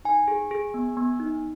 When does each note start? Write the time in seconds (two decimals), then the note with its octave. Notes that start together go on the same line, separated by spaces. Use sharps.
0.05 D#4 G#5
0.28 G#4
0.51 G#4
0.74 B3
0.97 B3
1.20 D#4